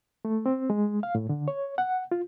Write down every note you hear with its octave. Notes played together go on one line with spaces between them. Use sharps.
A3
C4
G#3
F5
A2
D3
C#5
F#5
F4